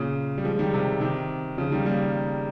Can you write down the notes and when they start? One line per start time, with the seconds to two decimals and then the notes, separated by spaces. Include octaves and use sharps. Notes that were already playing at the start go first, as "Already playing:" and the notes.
Already playing: A#2 C#3
0.38 G3
0.45 F3 G#3
0.59 D#3 G3
0.74 C3
1.01 C3 D#3
1.58 C#3 F3
1.72 D#3 G3
1.86 G3 A#3